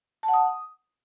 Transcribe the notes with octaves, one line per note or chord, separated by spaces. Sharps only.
A5
F#5
D#6